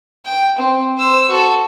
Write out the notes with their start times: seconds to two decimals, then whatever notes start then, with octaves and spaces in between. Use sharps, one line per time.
0.25 G5
0.58 C4
0.97 C5 E6
1.28 F#4 A4